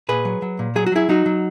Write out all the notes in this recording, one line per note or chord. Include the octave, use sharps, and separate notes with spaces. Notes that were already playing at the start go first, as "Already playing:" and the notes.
A#2 G#4 B4
F#3
F#3
A#2
F#3 G#4
F#4
F#3 E4 G#4
F#3 D#4 F#4
F#3